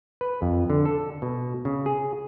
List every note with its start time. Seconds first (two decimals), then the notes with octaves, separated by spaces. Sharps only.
0.21 B4
0.42 F2
0.70 D3
0.85 A4
1.22 B2
1.65 C#3
1.86 G#4